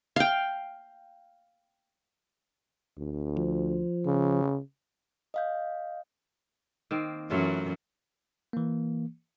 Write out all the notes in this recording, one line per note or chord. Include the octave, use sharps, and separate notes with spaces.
F5 G5
D2
F3
C#3
D#5 F5 G6
D#3 A#3 C4
F#2 E3 F#3 A3 F4
E3 A#3